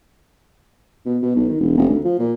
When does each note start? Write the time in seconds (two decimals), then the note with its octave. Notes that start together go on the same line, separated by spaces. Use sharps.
1.06 B2
1.22 B2
1.35 B1
1.49 D#3
1.60 E1
1.77 F1
1.89 D2
2.04 F3
2.19 A#2